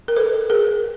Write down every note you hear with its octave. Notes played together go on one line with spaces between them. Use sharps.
A#4
A4 B4
G#4 A#4